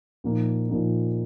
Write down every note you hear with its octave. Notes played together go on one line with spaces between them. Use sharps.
A#2 F3 A#3 D#4
A#2 F3 A#3 D#4